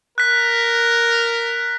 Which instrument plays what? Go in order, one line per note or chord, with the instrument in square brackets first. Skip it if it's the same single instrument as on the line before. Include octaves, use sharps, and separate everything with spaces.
[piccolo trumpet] A#4 [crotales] F#6 B6